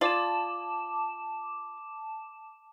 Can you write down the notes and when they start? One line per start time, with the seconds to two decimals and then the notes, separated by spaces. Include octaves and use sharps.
0.01 F4 D5 A5 D6 E7